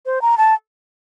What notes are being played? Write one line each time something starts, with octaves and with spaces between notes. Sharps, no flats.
C5
A#5
A5